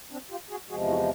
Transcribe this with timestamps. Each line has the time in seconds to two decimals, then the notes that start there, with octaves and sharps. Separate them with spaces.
0.11 C4 D4
0.30 F4 G4
0.50 F#4 G#4
0.69 E2 C3 F3 G#3 F#4 G#4
0.88 E4 F#4